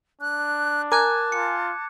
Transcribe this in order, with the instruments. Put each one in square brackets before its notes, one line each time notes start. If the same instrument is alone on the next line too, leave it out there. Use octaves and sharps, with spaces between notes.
[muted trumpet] D4 [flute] F#6
[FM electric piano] A#4 G#5 [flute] A5 [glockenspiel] D6 F#6 G#6
[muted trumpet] F4 [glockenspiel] C#7